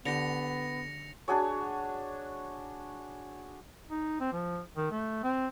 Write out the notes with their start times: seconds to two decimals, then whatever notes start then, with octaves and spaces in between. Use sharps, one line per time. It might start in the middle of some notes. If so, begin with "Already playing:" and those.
0.05 D3 B3 G4 A#6 C#7 F7
1.28 D4 F#4 G#4 C#5
3.90 D#4
4.20 C4
4.32 F3
4.76 D#3
4.91 A3
5.23 C4